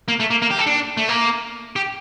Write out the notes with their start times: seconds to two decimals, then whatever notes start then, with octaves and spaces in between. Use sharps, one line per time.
0.08 A#3
0.20 A3
0.30 A#3
0.42 A#3
0.51 G4
0.59 A4
0.66 D4
0.97 A3
1.09 A#3
1.76 G4